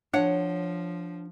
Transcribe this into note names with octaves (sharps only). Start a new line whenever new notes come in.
F3 D4 C#5 F#5